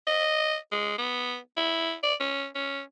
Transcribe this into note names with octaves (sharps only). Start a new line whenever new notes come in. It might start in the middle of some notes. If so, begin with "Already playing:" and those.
D#5
G#3
B3
E4
D5
C#4
C#4